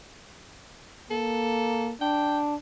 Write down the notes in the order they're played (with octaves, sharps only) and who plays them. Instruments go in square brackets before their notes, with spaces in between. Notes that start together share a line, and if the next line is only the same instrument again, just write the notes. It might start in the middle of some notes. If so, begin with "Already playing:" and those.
[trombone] A#3 [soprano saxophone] A4
[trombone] D4 [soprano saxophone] G5